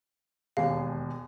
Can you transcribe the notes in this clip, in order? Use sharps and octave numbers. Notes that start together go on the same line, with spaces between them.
E1 D#2 G#3 F5